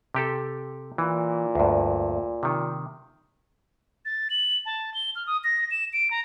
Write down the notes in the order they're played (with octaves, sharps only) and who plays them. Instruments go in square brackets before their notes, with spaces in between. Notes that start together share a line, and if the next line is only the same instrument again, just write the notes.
[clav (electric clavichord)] C3 G4 A4
[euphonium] A#2 [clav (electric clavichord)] E3
[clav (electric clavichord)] D2 G2
C3 D#3
[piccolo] A6
F#7
A5
G7
F6
D#6
A#6
E7
D7
A#5